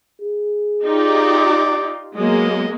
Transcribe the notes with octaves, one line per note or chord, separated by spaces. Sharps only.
G#4
D#4 F4 G4 D5
F#3 G#3 A#3 B3 D#5